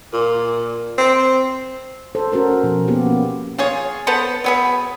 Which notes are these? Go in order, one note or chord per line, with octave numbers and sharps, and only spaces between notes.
A#2
C4
A4 C5
C#4 F#4 A#4 C5
B2 F3
A#3 B3 G4
C#4
F4 G#4 C#5
B3 A4 B4 C5
F#3 B3 G#4